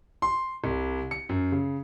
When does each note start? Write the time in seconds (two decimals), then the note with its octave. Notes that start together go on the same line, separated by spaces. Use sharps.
0.22 C6
0.64 C2
1.11 C#7
1.29 F#2
1.52 C#3